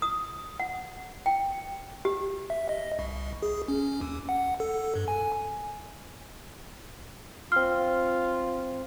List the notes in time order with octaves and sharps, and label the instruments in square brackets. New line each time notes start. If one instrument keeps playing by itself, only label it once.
[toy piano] D#6
F#5
G5
G4
[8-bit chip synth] E5
D#5
C2
G#4
C#4
D#2
F#5
A4
G2
G#5
[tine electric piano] C4 C6 [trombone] F4 [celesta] F6